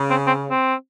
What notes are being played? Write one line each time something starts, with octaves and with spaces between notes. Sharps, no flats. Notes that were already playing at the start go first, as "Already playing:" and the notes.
Already playing: C#3
C4
C4
C4